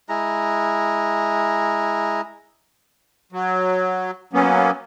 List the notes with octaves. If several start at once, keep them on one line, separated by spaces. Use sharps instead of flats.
G#3 E4 A#5
F#3
F#3 A#3 B3 C#4